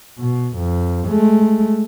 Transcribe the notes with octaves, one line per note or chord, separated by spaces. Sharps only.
B2
F2
G#3 A3